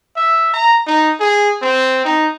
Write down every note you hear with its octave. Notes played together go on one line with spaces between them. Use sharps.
E5
A#5
D#4
G#4
C4
D#4